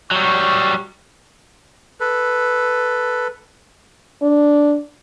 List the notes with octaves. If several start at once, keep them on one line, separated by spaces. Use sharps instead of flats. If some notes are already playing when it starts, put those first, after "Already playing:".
F#3 G3 C#6
A4 B4
D4